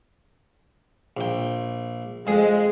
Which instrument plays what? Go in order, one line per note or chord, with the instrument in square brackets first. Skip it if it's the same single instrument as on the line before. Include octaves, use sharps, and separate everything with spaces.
[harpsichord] A#1 G5
[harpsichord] F2 G#4 [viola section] G#3